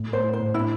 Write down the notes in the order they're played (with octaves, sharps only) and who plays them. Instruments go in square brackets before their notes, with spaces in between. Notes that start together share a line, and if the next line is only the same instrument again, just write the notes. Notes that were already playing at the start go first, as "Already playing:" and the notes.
Already playing: [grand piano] A2
[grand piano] A3 [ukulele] C5
[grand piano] E4
[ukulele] C5
[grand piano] A2
[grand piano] D4 [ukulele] E4